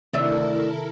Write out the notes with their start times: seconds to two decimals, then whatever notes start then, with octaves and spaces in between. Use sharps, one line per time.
0.13 D2 C3 D#3 D4 E4 A4 A#4 E5